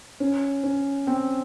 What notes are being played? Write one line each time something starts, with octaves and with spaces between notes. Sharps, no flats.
C#4
C#4
C4